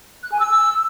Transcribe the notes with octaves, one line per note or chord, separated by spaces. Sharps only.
F#6
G#5
E6